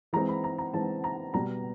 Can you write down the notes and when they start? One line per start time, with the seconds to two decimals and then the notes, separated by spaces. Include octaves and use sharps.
0.13 E3 G#3 C4 A#5
0.29 B5
0.44 A#5
0.58 A#5
0.74 E3 G#3 C4 A5
1.04 A#5
1.34 B2 G3 B3 A#5